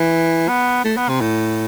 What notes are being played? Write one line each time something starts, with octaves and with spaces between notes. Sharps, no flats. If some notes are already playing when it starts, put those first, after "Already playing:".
Already playing: E3
B3
A3
B3
C3
A2